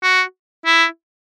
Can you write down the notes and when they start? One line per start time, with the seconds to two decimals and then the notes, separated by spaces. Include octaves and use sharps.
0.03 F#4
0.66 E4